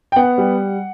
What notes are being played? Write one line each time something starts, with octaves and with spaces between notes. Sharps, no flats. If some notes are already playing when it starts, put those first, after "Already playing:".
G5
B3 F#5
G3